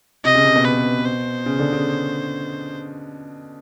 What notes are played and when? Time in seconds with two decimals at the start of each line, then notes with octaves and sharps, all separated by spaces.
0.25 C3 D#5
0.35 C#3
0.45 C3
0.56 B2
0.65 B4
1.05 C5
1.46 C#3
1.59 D3
1.73 C#3